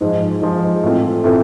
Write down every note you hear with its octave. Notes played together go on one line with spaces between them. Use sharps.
G#2 F3 G#3
G#2 F3 G#3
A2 E3 A3 C4 F4
A2 E3 A3 C4 F4